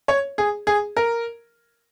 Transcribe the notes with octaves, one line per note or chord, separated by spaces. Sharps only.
C#5
G#4
G#4
A#4